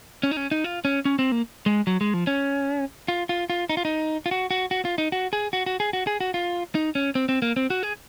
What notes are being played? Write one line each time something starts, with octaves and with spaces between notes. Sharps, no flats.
C#4
D#4
C#4
D#4
F4
C#4
C#4
C4
A#3
G#3
F#3
G#3
F3
C#4
F4
F4
F4
D#4
F4
D#4
F4
F#4
F#4
F#4
F4
D#4
F#4
G#4
F#4
F#4
G#4
F#4
G#4
F#4
F4
D#4
C#4
C4
C4
A#3
C4
F#4
G#4